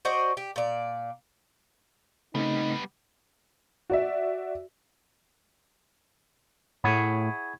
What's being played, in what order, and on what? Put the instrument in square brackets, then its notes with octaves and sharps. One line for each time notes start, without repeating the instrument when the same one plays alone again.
[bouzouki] F#4 C5 D5 D#5
G4
A#2 D5
[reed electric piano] C#3 A3 C4 [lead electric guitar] G3 B3 [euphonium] D#4
[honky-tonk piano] F#4 D5 E5
[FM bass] A2 [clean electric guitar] E4 G#4 C#5 [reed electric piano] F#5 B5